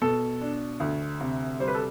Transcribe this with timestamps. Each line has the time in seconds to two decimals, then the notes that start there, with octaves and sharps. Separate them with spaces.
0.01 B2 A4
0.41 D4
0.80 D2
1.20 C3
1.60 G3 C5
1.68 B4
1.75 A4